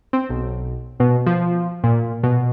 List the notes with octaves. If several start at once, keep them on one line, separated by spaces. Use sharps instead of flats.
C4
B1
B2
F3
A#2
B2